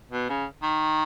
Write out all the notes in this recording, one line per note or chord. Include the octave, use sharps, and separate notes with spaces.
B2
C#3
D#3